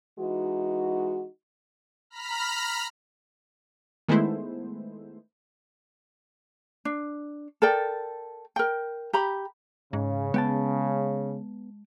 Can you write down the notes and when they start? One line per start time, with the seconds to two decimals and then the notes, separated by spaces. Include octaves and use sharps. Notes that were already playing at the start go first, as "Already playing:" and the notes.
0.20 E3 G#3 D#4 F#4
2.10 A#5 B5 F6 B6
4.08 D#3 G#3 A3 B3 E4 C5
6.85 D4
7.62 A4 A#4 D5 G5
8.56 A#4 G5
9.13 G4 A#5 B5
9.93 G#2 C#3
10.34 G#3 B3 G5 A5